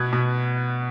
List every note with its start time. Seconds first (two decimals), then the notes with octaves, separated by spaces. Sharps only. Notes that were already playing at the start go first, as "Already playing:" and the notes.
Already playing: B2 B3 F#6 G#6
0.13 B2